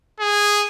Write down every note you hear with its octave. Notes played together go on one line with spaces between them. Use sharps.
G#4